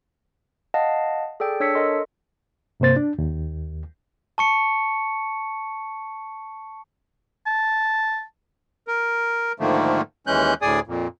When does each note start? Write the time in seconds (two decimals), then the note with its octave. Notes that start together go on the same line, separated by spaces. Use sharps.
0.74 D#5 F5 F#5 A5
1.40 G#4 A4 D5 G5
1.60 D4 C#5 E6 B6 C#7
1.75 A4 A#4 D#5 C6
2.80 G2 C3 A#3 C5 A6
2.96 D4
3.18 D#2
4.38 A5 C#6 C#7
7.46 A5
8.88 A#4
9.60 G#2 D3 D#3 F3 A3 A#3
10.27 D#2 E3 G#3 C#4 F#6 G6
10.62 D2 A2 G#4 D5 G#5 D#6
10.87 F2 A#2